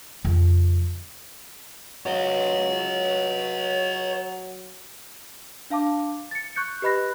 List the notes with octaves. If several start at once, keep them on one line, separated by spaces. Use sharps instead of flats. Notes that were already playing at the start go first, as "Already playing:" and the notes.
F2 C#3
F#3 C#5 D#5
D4 F5 A5 D6
A6 C#7
C#6 F#6 G6 C#7
G4 B4 D#5 B5 F#6 A#6